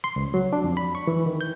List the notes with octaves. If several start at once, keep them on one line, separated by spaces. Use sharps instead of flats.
C6
C#2
F#3
D4
F2
B5
C#6
E3
D#3
G6